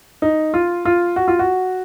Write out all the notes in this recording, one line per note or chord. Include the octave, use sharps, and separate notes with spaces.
D#4
F4
F4
F#4
F4
F#4